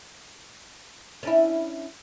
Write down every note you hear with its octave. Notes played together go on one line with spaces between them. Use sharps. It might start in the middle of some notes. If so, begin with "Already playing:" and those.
C#4 D4 E4